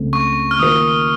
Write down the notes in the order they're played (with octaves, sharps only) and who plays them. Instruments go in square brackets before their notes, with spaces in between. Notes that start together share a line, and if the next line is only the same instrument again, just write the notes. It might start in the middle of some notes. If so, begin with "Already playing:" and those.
Already playing: [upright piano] C#2 C#3 A3 C4
[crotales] C#6
F6
[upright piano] D#3 A#3 F4 A#4 [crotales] D#6